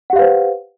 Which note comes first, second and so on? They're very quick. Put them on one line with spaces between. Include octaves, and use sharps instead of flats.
F#5 G4 F5 B4 C5